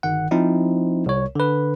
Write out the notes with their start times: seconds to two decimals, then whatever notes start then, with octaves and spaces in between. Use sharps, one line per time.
0.03 G1 D#3 F#5
0.31 F3 C4 D#4 E4
1.06 C2 C#5
1.35 D3 B4